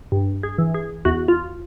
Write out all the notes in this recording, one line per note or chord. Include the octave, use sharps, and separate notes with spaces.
G2
G#4
E3
G#4
E2 F#4
F4